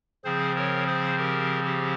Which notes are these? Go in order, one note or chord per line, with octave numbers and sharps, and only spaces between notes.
C#3 F3 C4 G#4 C5
A#4 C#5
G#4 C5
G4 A#4
G4